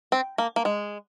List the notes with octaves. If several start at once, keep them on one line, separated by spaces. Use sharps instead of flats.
C4
A#3
A#3
G#3